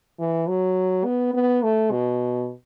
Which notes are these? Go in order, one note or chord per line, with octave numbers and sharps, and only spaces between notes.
E3
F#3
B3
B3
A3
B2